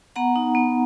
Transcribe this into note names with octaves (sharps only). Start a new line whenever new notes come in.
B3 F#5 A#5
D#4
B3